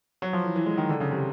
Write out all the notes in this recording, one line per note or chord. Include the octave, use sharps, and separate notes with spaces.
F#3
F3
E3
E3
G#3
D#3
D3
C#3
C3